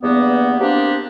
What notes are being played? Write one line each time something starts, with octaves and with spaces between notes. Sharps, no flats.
E2 G2 A#3 B3
A#3 C4 D4 G4